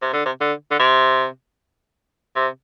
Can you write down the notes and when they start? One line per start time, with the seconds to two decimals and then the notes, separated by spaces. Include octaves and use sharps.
0.02 C3
0.13 D3
0.26 C3
0.41 D3
0.71 D3
0.79 C3
2.36 C3